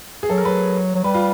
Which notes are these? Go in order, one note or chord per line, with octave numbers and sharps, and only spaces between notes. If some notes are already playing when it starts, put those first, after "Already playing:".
G#4
F#3 A4
A#4
F#3 B4
F#3
G3 B4
F4